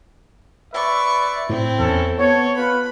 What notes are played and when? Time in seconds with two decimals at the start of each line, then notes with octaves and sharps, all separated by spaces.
0.74 B4 D5 E5 C#6
1.50 A2 C4 E4
1.79 E2 C#4 A4
2.19 B3 A4 C#5
2.57 F4 B4 B5